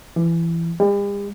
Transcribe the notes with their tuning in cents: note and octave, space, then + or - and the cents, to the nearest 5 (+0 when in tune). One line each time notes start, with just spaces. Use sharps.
E3 +20
G3 +45